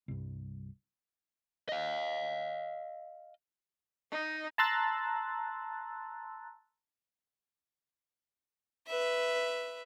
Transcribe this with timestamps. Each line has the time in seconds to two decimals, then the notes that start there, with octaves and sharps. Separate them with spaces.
0.08 C2 G2
1.69 D#5 F5
4.11 D#4
4.58 A5 A#5 C6 E6 F#6 A6
8.88 B4 E5